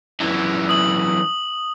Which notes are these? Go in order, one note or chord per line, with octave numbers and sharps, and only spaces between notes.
F#2 E3
D#6 F#7